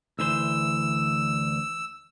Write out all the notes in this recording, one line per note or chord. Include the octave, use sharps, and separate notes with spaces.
D2 E3 C5 E6